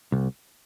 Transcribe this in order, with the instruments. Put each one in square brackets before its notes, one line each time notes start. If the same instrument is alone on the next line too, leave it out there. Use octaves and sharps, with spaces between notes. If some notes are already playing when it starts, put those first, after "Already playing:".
[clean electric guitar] C2